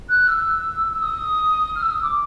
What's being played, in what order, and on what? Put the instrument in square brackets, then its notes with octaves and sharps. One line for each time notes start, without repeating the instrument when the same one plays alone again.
[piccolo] F#6
E6
E6
D#6
F6
E6
D#6
D6